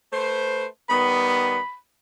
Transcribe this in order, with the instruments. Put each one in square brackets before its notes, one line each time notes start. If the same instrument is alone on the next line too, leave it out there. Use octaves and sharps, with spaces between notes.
[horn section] A3 B4 C5
[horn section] D#3 G3 B3 [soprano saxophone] B5